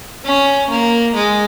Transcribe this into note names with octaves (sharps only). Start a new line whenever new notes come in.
C#4
A#3
G#3